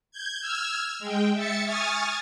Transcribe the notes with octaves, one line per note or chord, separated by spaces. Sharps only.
G6 G#6
E6 F6 G#6
G#3 G5
E5 A6 C#7
G#5 C#6 D#6 F6 A6